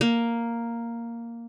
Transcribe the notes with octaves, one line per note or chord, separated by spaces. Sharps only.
A#3